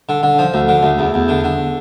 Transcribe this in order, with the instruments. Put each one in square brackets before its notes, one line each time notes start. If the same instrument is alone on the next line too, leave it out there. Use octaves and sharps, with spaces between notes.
[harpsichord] D3
D3
F3
D2
D3
D2
E2
E2
D3
D3